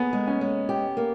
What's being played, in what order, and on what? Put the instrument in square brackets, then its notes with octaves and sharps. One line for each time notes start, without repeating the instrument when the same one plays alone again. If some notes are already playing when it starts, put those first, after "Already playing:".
Already playing: [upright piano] A#3 B3 [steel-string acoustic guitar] G#4
[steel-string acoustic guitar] G#3
[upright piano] C#4
[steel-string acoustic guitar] G#3
G4
A#3